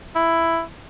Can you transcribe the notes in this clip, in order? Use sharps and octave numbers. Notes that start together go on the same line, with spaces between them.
E4